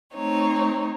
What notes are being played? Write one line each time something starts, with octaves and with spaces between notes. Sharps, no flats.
A3 C4 D#4 C#5